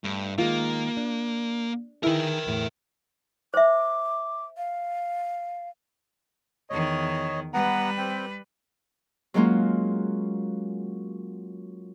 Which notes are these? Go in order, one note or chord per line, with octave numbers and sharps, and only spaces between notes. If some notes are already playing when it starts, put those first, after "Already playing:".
G2 A3
D#3 G#3 A#3 F4
D4
D#3 E4 G#4 A#4 B4 G5
E2 A2 A3
C5 E5 D6
F5
E2 D#3 C#5 D#5
G3 B3 B4 F#5 A#5
C4 G5
F#3 G#3 A#3 C#4 F4